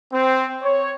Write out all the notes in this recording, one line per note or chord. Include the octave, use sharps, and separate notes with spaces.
C4
C#5